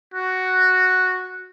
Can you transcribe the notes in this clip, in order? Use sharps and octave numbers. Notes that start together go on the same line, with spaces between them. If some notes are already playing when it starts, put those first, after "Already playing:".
F#4